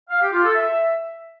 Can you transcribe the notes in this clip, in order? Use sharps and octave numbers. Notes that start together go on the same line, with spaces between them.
F5
G4
F4
A4
E5